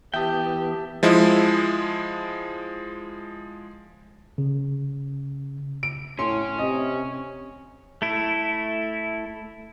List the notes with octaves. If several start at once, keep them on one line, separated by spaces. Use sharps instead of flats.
E3 B3 G4 E5 G5 A5 D#6
F3 G#3 E4
C#3
D7
A2 C#4 C6
C3 D#5
A3 E4